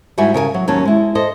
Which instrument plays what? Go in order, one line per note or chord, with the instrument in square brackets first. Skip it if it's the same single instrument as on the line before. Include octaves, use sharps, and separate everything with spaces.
[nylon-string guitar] G#2 G3 E4 F#4 G#5
C#3 A#4 E5 G#5
F#3
D#2 F#3 C#4 A5
G#3 E4
A4 C5 D#5